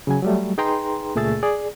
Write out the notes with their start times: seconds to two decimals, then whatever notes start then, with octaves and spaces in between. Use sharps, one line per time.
0.07 C#3 F#3 G#5
0.23 F#3 G3 A3
0.58 D#4 G#4 B4 G5 A#5 C6
1.15 C#2 A#2 A3 G#4 E6 A6
1.43 G#4 D5